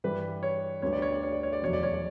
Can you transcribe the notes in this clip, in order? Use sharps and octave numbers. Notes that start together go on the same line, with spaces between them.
G2 E3 G3 B4
C#5
D2 D3 G3 B3 D4 C#5
D5
C#5
D5
C#5
D5
C#5
D5
F1 E2 B2 F#3 C#5
D5
C#5
D5